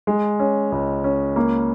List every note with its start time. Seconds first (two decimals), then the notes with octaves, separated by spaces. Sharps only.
0.07 G#3
0.40 C#4
0.72 C#2
1.04 C#4
1.36 A#3